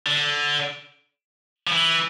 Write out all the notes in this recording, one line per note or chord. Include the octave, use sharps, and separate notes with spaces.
D3
F3
E3